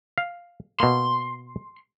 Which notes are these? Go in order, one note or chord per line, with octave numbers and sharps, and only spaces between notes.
F5
B2 A#3 C6